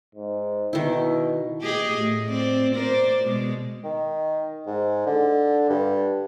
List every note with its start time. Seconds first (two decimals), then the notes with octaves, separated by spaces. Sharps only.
0.15 G#2
0.73 B2 D#3 E4
1.62 G4 G#4 D#5
1.99 A2
2.29 C4 D5
2.75 A#4 C5 D5
3.24 B2 G#3
3.84 D#3
4.66 G#2
5.06 D3
5.69 G2